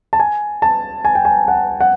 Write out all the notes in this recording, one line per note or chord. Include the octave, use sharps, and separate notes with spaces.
A5
G#5
A5
G#5
G5
G#5
F#5
F#5